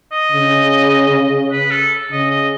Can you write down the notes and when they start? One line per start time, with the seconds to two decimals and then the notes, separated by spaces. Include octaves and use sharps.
0.12 D#5
0.32 C#3
1.52 B4
1.71 A4
2.11 C#3 D#5
2.31 D#5